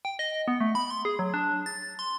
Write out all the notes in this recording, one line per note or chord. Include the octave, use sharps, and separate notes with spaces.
G5
D#5
B3
A3
B5
C6
G#4
F#3
D4
A6
C6